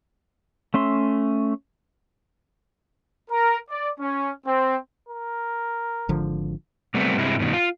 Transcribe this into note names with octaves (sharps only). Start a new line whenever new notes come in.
A3 C#4 E5 C6
A#4
D5
C#4
C4
A#4
G#1 D3 F3
C3 G3 A3 B3 C4
G2 C3 G#3 E4
G2 B2 D#3
F4